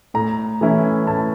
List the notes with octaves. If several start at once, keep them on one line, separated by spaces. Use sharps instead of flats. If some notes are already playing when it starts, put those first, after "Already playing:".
A2 A#5
E3 A3 C#4 E4
A2 A5